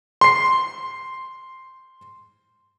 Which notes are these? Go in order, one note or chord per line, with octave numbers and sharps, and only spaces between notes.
C6 C7